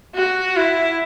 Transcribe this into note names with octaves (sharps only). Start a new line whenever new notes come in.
F#4
E4